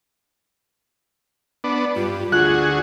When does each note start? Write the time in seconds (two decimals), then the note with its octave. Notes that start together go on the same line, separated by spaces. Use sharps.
1.64 B3 D4
1.96 G2 F4
2.32 D2 F#4 G#4 F#6